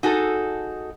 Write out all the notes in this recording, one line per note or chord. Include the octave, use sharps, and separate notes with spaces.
D#4 F#4 G#4 A4